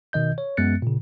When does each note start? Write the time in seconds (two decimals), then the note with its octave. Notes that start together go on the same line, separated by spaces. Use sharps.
0.13 B2 D#3 D#5 G6
0.38 C#5
0.57 F#2 G#3 B3 F#6 A6 C#7
0.82 A#2 C#3